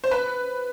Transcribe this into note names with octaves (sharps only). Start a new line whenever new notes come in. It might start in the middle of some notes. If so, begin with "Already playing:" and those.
C5
B4